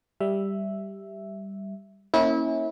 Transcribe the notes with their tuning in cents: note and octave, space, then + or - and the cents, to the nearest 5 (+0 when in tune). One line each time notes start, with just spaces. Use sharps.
G3 +0 E5 +0
A#3 +0 C#4 -20 E4 -30